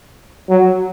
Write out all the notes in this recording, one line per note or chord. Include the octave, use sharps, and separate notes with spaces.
F#3